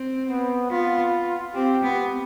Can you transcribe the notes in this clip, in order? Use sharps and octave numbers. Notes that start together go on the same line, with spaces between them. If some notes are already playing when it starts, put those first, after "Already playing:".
Already playing: C4
B3
B3 F4
C4 G4
B3